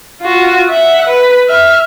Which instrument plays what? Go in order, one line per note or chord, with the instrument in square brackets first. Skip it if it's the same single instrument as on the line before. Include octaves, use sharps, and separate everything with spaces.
[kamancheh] F4 F#4
E5 F#5
B4
E5 F6